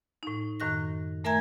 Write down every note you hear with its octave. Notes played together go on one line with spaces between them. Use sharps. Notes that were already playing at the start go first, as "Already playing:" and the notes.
A2 D#4
F#2 A2 D#3 F#6 A#6
A3 A#4 E5 G#5 A#5 G#6